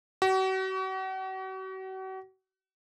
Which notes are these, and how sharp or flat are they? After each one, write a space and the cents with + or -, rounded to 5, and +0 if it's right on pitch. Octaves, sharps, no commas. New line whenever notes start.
F#4 +40 C#6 +35